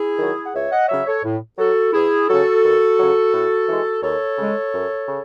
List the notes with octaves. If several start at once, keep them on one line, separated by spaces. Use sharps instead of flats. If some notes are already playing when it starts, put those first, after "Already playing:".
Already playing: E4 G#4
D#3 F#3
F#5
C#2 C#5 E5
D#5 F#5
C#3 F#3 C#5 E5
A4 C#5
A2
F#3 F#4 A4
E2 E4 G#4
C#3 F#3 F#4 A4
D#2
C#3 F#3
A2
E3 G#3
D#2 A4 C#5
C#3 G#3
F#2
C#3